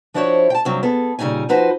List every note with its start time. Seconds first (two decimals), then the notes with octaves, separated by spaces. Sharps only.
0.14 F3 D4 E4 F#4 C5 C#5
0.50 G5 A5
0.65 G2 C3 F#3
0.83 B3 G#4 A4
1.19 A#2 C#3 G3 D#4 G#5
1.49 F3 D#4 F#4 B4 C5